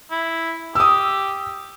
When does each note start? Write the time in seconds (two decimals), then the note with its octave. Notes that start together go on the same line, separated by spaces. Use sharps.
0.11 E4
0.75 G4 D#6 E6